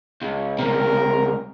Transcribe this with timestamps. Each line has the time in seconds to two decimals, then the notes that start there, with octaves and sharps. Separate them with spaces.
0.22 C#2
0.59 C#2 C3 A#4